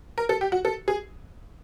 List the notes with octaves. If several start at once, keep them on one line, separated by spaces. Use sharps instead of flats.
A#4
A4
G4
F#4
A4
G#4